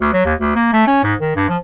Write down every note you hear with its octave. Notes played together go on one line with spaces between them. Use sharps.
D2
F#3
D#2
D2
A#3
A3
C#4
G#2
D#3
G2
F3